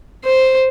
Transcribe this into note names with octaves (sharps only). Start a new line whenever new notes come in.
C5